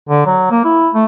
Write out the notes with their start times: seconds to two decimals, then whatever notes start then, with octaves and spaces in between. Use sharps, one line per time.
0.09 D3
0.26 F#3
0.51 A#3
0.65 E4
0.94 A3